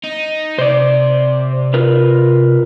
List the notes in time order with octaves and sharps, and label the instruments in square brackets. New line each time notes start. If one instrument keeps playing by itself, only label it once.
[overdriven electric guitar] D#4
[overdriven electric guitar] C3 [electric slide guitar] C5 D5
[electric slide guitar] F4 A#4 B4